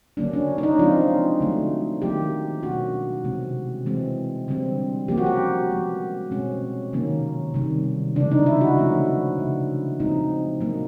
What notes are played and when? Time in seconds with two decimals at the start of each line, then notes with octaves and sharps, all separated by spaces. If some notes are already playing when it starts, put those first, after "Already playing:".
0.17 D3 F#3 A#3 C#4 D4
0.33 C#4
0.58 D4
0.63 D#4
0.79 F3 G#3 C4 F4
1.40 D3 F#3 A3
2.01 D#3 F#3 A#3 G4
2.63 B2 G3 A#3 C#4 F#4
3.24 C3 E3 G#3 C4
3.86 E3 G#3 C4
4.48 D3 G3 C4
5.08 F3 A#3 C#4 G4
5.18 F#4
5.26 G4
5.71 F3 G#3 B3
6.31 B2 G#3 C4 C#4
6.93 C3 D#3 F#3 A#3 C#4
7.54 C3 D#3 G3
8.15 C#3 E3 G#3 D4
8.32 D#4
8.46 E4
8.61 F#4
8.77 D3 F3 A3 C#4
9.38 C#3 F#3 B3
9.99 A#2 F3 G#3 C4 D#4
10.61 A#2 F#3 A#3